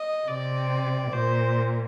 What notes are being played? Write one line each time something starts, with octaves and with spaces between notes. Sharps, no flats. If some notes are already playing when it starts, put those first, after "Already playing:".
Already playing: D#5
C3 D5
A#2 C5